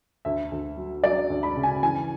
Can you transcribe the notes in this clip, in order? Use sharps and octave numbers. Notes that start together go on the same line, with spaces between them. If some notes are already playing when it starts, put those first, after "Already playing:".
D2 E5
D2
F#3
F#3 D5
D2
B5
C#3
G#5
E3 G#5